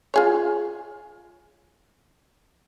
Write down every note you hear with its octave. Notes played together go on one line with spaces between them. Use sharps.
F4 G#4 C#5